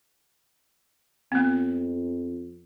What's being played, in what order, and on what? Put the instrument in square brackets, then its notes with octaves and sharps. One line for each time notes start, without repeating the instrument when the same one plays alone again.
[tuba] F2 [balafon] B3 C4